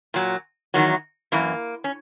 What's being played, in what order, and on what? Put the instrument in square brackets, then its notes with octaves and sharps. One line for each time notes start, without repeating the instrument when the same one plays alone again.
[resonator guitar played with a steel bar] A#2 F#3
E2 D#3 F#3
F#2 E3 A#3
C#4